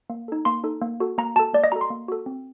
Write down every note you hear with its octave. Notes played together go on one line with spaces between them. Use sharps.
A#3
D#4 A4
A#3 C6
D#4 A4
A#3
F#4 A4
A#3 A#5
F#4 A4 A5
A#3 D5
D#5
F#4 A4 A#5
C6
A#3
F#4 A4
C4